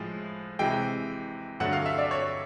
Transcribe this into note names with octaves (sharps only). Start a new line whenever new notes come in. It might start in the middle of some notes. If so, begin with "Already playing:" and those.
Already playing: A2 F3 G#3
C3 E3 G#3 G5
G2 D3 F#3 A3 F#5
F5
E5
D5
C#5